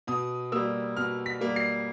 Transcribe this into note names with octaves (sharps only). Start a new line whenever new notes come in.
B2 D#6
G3 A#3 E6
B2 F6
B6
G3 A#3
C7